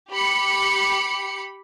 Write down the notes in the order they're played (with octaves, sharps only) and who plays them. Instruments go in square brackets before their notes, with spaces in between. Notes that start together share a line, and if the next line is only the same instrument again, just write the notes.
[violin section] G4 B5 C#7